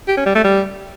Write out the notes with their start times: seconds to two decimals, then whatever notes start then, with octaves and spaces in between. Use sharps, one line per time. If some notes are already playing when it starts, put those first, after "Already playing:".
0.08 G4
0.17 C#4
0.26 G3
0.35 A3
0.44 G3